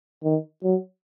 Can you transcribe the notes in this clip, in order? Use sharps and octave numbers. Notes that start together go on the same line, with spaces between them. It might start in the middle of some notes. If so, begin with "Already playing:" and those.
D#3
F#3